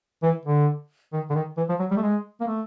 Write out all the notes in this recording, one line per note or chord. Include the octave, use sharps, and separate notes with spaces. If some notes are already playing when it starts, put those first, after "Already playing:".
E3
D3
D#3
D3
D#3
E3
F3
F#3
G3
A3
G#3
A#3
A3